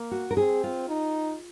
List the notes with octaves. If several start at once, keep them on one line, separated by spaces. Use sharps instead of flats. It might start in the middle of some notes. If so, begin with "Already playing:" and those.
Already playing: A#3
F#4
A#4
C4 G#4
F4
D#4